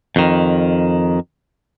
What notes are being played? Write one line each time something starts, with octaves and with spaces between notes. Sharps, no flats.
F2 D#3